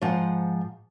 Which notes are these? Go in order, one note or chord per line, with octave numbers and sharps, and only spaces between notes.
G#2 F3 C5 F#5